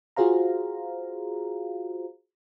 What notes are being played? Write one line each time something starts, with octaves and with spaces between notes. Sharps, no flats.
F4 F#4 G#4 C5 F5 A#5